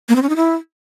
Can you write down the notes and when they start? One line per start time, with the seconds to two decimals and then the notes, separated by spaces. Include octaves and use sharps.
0.09 A#3
0.16 C4
0.23 C#4
0.29 D#4
0.36 E4